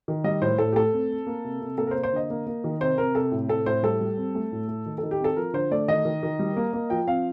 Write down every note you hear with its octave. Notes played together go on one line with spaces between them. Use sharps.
D#3
G3 D#5
A2 C5
A2 A4
G4
A3 A4
C4
C4
A#3
C3
C3
A#3 A4
A#4
C5
A#3
C5
D3 D#5
A#3
A#3
D#3
C3 C5
C3 A#4
C3 A4
A2
C4 A4
A2 C5
G3 A4
G3
C4
A3
A2
A3
D#3
A4
D#3
G4
C4 A4
F3 A#4
D3 C5
A3 D5
D#3 D#5
D#3
D#3
G3
A#3
A#3
F3 G5
C4 F5